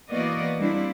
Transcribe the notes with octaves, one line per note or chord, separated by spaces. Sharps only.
E3 A#3 B3 F#4 D5 D#5
G3 A#3 C4 D4 E4